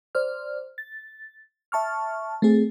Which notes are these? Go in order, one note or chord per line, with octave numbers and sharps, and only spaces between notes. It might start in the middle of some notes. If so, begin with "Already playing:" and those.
C5 D5 F6
A6
E5 A5 C#6 F6
A3 C4 G#4